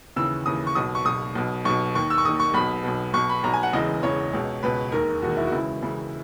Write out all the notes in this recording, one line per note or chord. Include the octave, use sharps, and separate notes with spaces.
D#2 C#3 E3 E6
D#2 C#3 E3 D#6
C#6
B1 B2 D#6
C#6
B1 B2 D#6
B1 B2
B1 B2 C#6
D#2 D#3 C#6
E6
C#6
D#2 D#3 D#6
C#6
B1 B2 B5
B1 B2
B1 B2 C#6
B5
B1 B2 A#5
G#5
F#5
E1 E2 C#3 E3 D#5
E1 E2 C#3 E3 C#5
C#2 B2
C#2 B2 B4
E1 D#2 D#3 A#4
E1 D#2 D#3 F#4
E4
F#4
C#2 C#3 E3 E4
C#2 C#3 E3